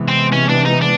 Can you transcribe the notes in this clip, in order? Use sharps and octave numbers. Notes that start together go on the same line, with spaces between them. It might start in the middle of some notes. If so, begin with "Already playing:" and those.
Already playing: C3 E3 G#3 B3
C4
C#4
D4
D#4
D4